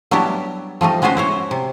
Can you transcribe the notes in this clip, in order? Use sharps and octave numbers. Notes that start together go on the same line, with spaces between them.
F#3 G3 B3 D4 E4 G4
F3 G3 A3 D#4
G#3 B3 C#4 F#4 B4 C5
E4 C5 C#5
C3